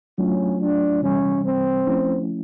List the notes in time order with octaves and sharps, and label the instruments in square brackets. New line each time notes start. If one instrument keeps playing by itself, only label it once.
[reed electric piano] F#3 A3 D4 F4 [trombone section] C#4
[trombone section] D4
[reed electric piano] C3 E3 G3 [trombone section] C#4
[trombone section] C4
[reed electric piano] F3 A3 C#4 E4